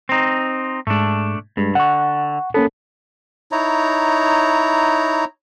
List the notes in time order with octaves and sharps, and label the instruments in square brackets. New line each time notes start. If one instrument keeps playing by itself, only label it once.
[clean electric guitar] C4 D#4
[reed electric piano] G#2 G#3 [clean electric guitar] A3 D4
[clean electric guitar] G2 [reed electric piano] G#3
[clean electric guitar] D3 [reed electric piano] F#5 C#6
[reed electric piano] A#3 C#4 A4 [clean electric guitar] B3
[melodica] D#4 E4 C#5 A#5